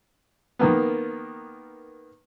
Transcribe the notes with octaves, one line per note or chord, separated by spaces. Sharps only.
D#3 A#3 B3